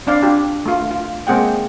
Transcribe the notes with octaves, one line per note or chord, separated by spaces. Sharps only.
C4 D4 D5 F5
D4 F4 G4
A3 F4
F4
G#3 A#3 C4 G#4 F#5 G5